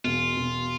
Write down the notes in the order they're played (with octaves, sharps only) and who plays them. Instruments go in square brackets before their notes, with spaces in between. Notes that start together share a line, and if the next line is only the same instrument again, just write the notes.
[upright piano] E1 [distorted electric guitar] F4
[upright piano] E1